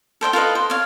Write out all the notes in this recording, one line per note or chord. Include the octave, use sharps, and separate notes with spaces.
A4 C5 E5 G5
F4 A4 B4 D#5
C5
C#5 F5